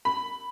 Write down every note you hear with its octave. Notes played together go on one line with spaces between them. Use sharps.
B5